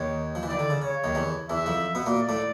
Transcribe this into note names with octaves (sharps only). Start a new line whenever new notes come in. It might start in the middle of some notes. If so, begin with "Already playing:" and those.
Already playing: D#2 D#3 C#5
F3
E3
D#3 D5
D3
C#3
C#3 C#5
D#2 D#3
E2 E3
E2 E3 E5
F2 F3
B2 B3
A#2 A#3
D5
A2 A3